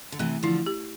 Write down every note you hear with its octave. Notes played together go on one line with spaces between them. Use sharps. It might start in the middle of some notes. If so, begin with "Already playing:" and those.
D3
C3 E3 A3
D3 F3 E4
G4